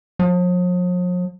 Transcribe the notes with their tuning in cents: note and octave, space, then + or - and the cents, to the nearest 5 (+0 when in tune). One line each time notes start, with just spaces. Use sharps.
F3 +45